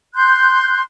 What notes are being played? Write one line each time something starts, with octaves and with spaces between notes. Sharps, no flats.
C6 F#6 G6